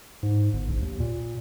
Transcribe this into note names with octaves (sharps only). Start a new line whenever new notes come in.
G#2
G1
A#1
D#2
A#2